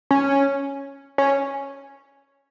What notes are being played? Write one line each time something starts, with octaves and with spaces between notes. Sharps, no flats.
C#4
C#4